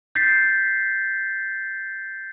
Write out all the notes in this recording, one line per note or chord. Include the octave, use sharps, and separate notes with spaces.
G6 A6 B6 C7